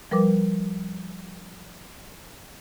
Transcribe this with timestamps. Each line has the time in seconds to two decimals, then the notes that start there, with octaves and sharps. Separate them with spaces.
0.11 F3 G3 A#4 B4 D6